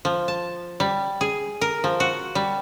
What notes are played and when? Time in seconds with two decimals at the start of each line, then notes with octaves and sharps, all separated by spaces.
0.05 F3
0.28 A5
0.80 G3
1.21 G#4
1.61 A#4
1.84 F3
2.00 F#4
2.35 G3